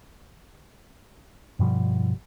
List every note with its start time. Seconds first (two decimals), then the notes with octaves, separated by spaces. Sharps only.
1.59 G2 B2 F3 G3